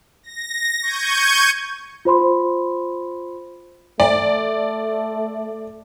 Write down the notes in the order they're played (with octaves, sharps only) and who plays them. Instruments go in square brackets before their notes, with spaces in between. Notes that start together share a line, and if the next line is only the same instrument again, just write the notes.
[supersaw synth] A#6
C#6 G6 G#6 D#7
[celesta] F4 C5 B5 C6
[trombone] A3 [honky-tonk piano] D5